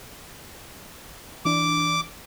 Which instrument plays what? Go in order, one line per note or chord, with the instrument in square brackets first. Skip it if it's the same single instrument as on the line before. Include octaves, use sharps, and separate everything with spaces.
[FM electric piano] E3 D4 [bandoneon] D6